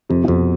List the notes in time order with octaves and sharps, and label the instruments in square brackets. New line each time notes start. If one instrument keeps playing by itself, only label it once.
[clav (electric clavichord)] F2 [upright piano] C3
[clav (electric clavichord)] F2 [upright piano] B2